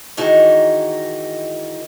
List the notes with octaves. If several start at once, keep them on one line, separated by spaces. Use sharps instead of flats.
D#3 E3 G#3 D#4 F#4 A#4